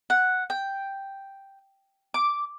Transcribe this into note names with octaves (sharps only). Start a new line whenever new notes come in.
F#5
G5
D6